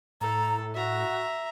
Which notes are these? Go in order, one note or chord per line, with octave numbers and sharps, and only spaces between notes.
A2 A4 A#5
F#4 E5 A#5